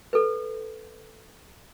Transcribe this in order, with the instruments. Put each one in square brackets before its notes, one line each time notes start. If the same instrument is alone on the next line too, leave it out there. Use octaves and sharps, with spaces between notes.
[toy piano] A4 B4